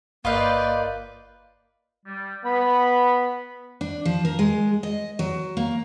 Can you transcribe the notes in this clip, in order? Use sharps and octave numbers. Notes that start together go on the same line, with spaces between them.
G1 A#3 F4 B4 D5 D#5 F5 G6
G3
B3 B5
D4
F3
A#4
G#3
D#5
F#3
A#3